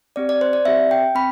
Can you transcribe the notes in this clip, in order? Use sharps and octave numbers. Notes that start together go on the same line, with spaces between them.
C4 G4 D5
D5
C5
D5
C4 G4 E5
G5
C4 B5